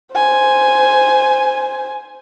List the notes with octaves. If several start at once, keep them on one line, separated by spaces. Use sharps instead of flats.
C5 G#5